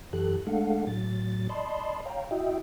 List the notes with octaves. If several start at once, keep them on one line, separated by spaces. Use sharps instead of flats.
F#2 E3 G4 A4 F#6
G#3 A3 D4 A4 F5 F#5
A2 F#3 A6
D5 D#5 A5 B5 C6
C#5 F5 G5 A#5
E4 F#4 D#5 E5 G5